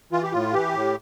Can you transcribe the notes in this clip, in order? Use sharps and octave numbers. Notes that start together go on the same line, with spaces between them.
E3 F4
G4
A2 F4
E3 G4
A2